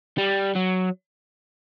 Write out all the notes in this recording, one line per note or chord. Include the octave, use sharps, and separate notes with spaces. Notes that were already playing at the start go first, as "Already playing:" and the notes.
G3
F#3